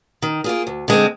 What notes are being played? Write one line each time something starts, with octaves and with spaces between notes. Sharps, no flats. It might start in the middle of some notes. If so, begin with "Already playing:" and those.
D#3
A#3 F4 G#4
D2
D3 G#3 C4